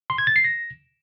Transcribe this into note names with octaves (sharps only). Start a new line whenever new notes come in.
C6
G#6
A6
C7
A#6